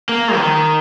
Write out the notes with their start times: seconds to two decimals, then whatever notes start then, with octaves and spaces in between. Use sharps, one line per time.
0.09 A#3
0.36 D#3